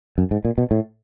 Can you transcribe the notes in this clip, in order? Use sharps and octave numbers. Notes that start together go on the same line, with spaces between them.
F#2
G#2
A#2
B2
A2